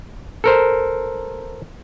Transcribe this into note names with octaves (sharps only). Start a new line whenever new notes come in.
A4 A#4 C5